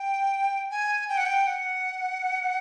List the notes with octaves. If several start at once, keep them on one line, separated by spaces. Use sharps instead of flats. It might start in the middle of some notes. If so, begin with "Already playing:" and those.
Already playing: G5
G#5
G5
F#5
G5
F#5